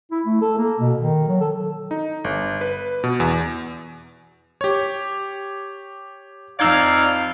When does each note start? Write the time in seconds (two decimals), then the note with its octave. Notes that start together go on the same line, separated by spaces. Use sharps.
0.11 E4
0.26 A3
0.41 A4
0.58 A#3
0.79 B2
0.98 D#3
1.28 F#3
1.40 A4
1.91 D#4
2.24 G1
2.61 B4
3.04 B2
3.20 E2
4.61 G4 C#5
6.60 F2 D#4 D5 F5 E6 G#6